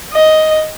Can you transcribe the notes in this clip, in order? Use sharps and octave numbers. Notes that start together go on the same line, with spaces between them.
D#5